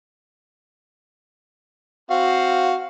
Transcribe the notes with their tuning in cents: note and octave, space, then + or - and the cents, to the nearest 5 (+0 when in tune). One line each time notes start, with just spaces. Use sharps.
C4 +0 F#4 +0 F5 +0